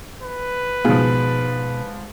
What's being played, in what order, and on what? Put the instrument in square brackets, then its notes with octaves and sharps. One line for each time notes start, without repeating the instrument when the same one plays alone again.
[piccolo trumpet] B4
[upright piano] G#2 F3 [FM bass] B2 [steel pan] G#4 F5